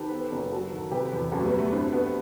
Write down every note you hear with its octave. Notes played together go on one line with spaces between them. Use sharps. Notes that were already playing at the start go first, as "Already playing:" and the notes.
Already playing: D#3 G4 A4 B4 C5
B3
F#1
F#3 F#4 A4
D#2
C3 G4 B4
E2
F#2 F#4 A4
A3
G3 B3
F#2
A3
G2 A3 C4
B3